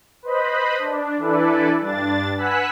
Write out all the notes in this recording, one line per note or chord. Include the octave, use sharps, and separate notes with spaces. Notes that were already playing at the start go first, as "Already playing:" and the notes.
B4 C5 D#5 B5
D4
E3 D4 E4 A4 B4 D5
G2 D4 A6
B4 F#5 G#5 E6 F#6 B6